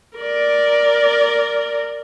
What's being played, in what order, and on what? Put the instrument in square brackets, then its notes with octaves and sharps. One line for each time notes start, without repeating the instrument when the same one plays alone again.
[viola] A#4 D5